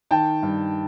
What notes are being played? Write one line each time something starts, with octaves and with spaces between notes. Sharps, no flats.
D#3 G5 A5
G2